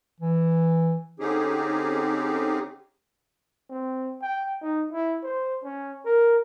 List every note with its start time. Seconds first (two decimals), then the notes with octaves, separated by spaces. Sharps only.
0.20 E3
1.20 D3 C4 C#4 D#4 G4 G#4
3.70 C4
4.22 G5
4.62 D#4
4.93 E4
5.23 C5
5.63 C#4
6.05 A#4